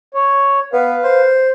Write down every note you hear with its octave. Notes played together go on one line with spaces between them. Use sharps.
C#5
B3 B4 F5
C5